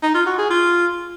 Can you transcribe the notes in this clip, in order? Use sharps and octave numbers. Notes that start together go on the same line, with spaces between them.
D#4
F4
F#4
G#4
F4